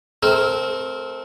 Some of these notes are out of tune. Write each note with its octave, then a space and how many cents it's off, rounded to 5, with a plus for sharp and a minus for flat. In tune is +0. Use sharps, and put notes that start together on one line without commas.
A3 -30 C4 +0 A#4 -10